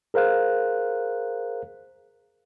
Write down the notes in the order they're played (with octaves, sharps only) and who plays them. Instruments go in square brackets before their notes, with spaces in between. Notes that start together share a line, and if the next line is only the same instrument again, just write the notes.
[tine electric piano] G#4 A#4 C5 F5 F#6